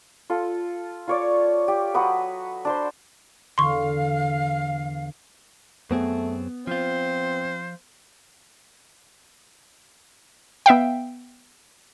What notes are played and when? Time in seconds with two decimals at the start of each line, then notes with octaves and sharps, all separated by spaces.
0.30 F4 A4
1.08 F4 C#5 D5
1.68 G4
1.94 F#3 F#4 B4 D#6
2.65 D4 C5 C6
3.58 E2 D3 F5 C6 C#6
5.91 F#2 A3 B3 C4 G#4
6.67 F3 C4 F4 C5
10.66 B3 E5 F5 G5